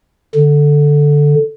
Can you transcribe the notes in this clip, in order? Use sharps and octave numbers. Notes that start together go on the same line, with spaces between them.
D3